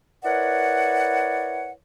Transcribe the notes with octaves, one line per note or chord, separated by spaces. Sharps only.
E4 A#4 B4 C#5 D5 F#5